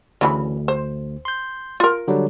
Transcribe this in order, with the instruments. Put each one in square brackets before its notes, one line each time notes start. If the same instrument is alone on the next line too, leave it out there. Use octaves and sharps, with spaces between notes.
[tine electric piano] D2 [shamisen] C#3 E3 B5
[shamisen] C5
[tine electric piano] C6 G6
[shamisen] F4 A#4
[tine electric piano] D3 F#3 G3